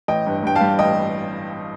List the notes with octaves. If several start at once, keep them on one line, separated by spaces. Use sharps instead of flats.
A1 D#5 G5
G2
G2 G5
F5 A5
G3
A1 D#5 G5